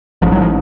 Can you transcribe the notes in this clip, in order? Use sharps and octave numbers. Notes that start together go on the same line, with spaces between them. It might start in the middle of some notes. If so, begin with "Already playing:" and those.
A1 G#2 F3
F#3
F3